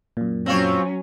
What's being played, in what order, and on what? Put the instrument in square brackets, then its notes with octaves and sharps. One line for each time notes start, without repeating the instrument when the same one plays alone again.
[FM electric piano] F#2 A#2
[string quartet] F#3 C#4 [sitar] C4 F4 C#5